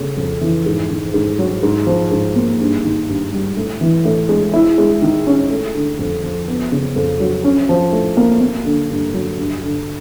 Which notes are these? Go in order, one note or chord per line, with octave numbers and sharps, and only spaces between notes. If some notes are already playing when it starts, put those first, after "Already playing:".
Already playing: C#3 A3
F2
E3
G#2
D#3
G#2
F#3
G#2
F3
G#2
A#3
G2
D#3
G2
G3
A2
E3
A2
G#3
E4
G#3
D#3
C#4
A3
D3
F2
F3
B3
C#3
F2
F#3
C#4
F3
A2
A#3
A#3
D3
G2
F#3
G2
D3